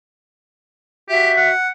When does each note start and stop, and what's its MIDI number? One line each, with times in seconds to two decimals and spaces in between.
1.09 1.50 66
1.09 1.31 67
1.09 1.50 76
1.37 1.69 78